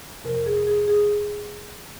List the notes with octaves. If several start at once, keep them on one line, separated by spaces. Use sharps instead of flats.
F2 C3 F3 A#4
G#4
G#4
G#4